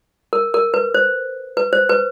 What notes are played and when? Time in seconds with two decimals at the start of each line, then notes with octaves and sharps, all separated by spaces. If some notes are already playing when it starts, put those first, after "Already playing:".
0.33 A#4
0.54 A#4
0.74 B4
0.94 C5
1.57 B4
1.73 C5
1.89 B4